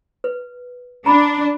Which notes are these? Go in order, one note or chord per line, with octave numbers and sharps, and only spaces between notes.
B4
D4 A#5 B5